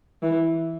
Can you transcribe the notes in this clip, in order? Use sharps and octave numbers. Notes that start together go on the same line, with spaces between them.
E3